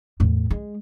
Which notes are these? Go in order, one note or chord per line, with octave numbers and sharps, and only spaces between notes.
E2 A2
G#3